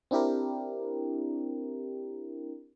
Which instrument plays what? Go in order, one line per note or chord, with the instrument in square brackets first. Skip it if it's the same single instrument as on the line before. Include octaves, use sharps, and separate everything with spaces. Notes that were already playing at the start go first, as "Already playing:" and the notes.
[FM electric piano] C4 D4 E4 G4 A#4